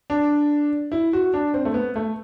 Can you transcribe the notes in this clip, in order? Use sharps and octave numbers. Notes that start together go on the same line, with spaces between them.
D4
E4
F#4
D4
C4
A3
B3
A3